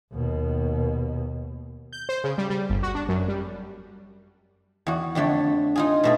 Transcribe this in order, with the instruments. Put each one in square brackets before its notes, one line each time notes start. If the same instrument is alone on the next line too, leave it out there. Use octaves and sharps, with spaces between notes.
[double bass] D#2 B2
[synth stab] G6
C5
C#3
G3
G3
G1
F#4
D4
F#2
G3
[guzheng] E2 F#4
F2 D3 A3 C#5
D#4 F4 G#4
B2 A3 G#4